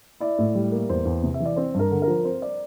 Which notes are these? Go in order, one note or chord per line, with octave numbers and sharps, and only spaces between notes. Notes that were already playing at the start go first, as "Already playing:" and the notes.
E4 D5
A2
G3
A#3
E2 C5
E2
C3
E5
E3
D5
C4 C5
G2 A#4
D3
A#4
F3
C4 C5
D5